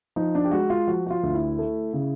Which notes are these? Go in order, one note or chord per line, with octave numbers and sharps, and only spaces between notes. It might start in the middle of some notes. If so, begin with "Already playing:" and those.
F3 D#4
D4
G4
G#3 F#4
F4
F3 F#4
F#4
F4
D2
E4
A3
C#3